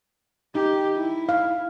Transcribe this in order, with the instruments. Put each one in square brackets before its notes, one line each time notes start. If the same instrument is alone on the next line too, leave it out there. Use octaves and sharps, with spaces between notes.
[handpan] D#4 [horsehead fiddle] G4
[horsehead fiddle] E4
[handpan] F5